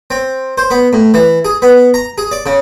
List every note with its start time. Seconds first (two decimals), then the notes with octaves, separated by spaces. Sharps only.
0.11 C4
0.58 C5
0.71 B3
0.93 A2
1.14 E3
1.45 G#4
1.62 B3
1.94 A#5
2.18 G#4
2.32 D5
2.46 C#3